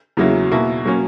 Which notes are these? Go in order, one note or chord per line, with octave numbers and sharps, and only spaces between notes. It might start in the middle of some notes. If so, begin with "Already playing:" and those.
E2 C#3 F#3 A#3 E4
B2 A#3 E4
F#3 A#3 C#4